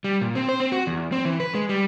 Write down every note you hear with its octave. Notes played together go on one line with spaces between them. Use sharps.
G3
A#2
C4
C5
C4
F#4
E2
C4
E3
B4
G#3
G3